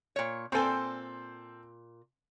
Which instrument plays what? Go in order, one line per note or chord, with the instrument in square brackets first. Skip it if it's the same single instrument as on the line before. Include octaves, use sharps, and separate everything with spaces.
[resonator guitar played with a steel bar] A#2 C#5
[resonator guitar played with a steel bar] A#2 G#5 [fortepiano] C4 A4 C5